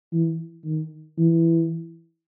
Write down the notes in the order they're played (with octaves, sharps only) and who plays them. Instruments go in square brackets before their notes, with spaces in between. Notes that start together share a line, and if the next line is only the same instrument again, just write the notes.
[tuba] E3
D#3
E3